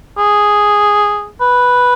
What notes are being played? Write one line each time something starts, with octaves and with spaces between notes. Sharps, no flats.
G#4
B4